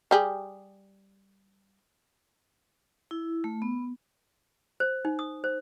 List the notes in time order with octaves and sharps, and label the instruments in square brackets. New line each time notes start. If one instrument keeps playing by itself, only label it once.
[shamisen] G3 G4 G#4
[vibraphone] E4
A3
B3
[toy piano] C5
D#4
D#6
C5